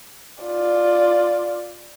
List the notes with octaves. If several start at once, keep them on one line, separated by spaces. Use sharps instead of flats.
F4 D5